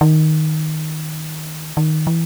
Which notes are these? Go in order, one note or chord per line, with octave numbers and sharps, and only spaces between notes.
D#3
D#3
E3